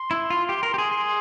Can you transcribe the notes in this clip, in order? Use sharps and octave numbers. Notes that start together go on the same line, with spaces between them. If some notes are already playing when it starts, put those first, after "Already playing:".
Already playing: C6
E4
F4
G4
A#4
G4
G#4
G#4